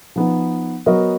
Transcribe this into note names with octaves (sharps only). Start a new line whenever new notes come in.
F3 B3 D#4
F#3 B3 F#4 A#4 D#5